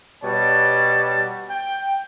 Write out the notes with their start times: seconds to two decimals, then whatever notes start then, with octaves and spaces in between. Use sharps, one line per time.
0.24 B2 G3 C#5 F#5 A5
1.50 G5